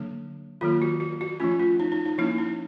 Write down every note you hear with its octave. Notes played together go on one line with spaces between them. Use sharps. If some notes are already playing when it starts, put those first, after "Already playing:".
Already playing: D3 F#3 A#3 D4
D#3 F#3 A#3 F4
F#4
F#4
F#4
F3 A3 C#4 F4
F4
D#4
D#4
D#4
F3 A#3 C#4 E4
D#4